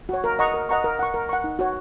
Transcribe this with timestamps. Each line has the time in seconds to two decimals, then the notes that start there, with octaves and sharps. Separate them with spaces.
0.09 F#4 C#5
0.24 A#4
0.39 D#5 F#5 A#5 C#6
0.54 A#4
0.69 D#5 F#5 A#5 C#6
0.84 A#4
0.99 F#5 C#6
1.14 A#4
1.29 F#5 C#6
1.44 D#4
1.59 F#4 C#5